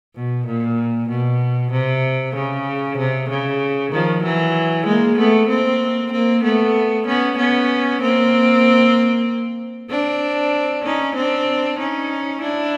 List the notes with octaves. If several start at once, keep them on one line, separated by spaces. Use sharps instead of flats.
B2
A#2
B2
C3
C#3
C3
C#3
D#3 F3
E3 F#3
G#3 A#3
A3 B3
A#3 C4
A#3 C4
A3 B3
B3 C#4
B3 C#4
A#3 C4
C4 D4
C#4 D#4
C4 D4
C#4 D#4
D4 E4